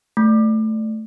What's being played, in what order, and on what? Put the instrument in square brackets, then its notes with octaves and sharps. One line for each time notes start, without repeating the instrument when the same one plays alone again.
[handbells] A3